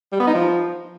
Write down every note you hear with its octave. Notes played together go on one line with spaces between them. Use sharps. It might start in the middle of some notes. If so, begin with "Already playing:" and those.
G3
B3
D#4
F3